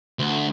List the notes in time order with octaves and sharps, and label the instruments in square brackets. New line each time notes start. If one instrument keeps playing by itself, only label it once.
[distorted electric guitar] D2